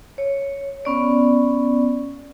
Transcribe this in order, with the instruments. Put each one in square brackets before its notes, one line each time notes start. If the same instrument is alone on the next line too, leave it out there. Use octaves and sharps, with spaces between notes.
[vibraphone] C#5
B3 C#4 D5